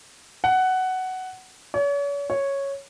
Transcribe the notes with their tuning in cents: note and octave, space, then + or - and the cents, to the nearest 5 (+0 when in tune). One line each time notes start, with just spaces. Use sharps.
F#5 +10
C#5 +40
C#5 -5